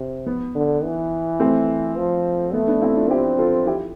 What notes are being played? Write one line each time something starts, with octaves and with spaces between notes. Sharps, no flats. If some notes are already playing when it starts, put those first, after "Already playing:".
Already playing: C3
B3
D3
E3
A3 C4
F3
A3 B3
B3 D4
C4 E4
D4 F4
C4 E4 G4
F4 A4
E4 G4